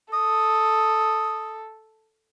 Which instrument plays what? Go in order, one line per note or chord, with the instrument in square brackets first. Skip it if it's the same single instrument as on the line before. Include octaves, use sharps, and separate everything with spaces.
[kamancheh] A4 [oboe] D#6